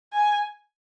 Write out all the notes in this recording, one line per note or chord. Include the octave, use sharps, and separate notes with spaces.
G#5